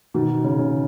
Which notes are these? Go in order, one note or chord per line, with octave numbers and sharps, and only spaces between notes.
B2 D#3
C#3
C#3